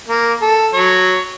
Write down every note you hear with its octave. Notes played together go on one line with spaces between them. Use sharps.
A#3
A4
F#3 C#5